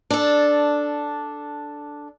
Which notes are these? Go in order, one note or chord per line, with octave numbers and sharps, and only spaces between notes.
D4 A4